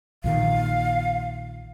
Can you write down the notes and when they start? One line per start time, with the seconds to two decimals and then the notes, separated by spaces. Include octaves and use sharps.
0.24 A#1 A#2 D#3 F5